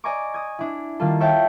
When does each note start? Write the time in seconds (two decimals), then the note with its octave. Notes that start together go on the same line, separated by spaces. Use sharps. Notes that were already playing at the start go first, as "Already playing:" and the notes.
0.04 D5 D#5 G#5 A#5 C#6 D6
0.34 D#6 G#6
0.59 D4 E4
1.00 D#3 G3 A#3 F4 A4
1.20 C#5 E5 F5 G5 A5 B6